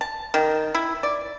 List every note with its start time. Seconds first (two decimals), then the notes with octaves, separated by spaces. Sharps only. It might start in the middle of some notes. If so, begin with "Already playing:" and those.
0.01 A5
0.34 D#3
0.75 E4
1.03 D5